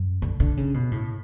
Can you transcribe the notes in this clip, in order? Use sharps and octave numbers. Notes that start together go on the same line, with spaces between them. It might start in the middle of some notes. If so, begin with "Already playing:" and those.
Already playing: F#2
D3
D3
C#3
B2
A2